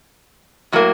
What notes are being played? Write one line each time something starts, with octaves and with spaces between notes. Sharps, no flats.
A2 F#3 A#3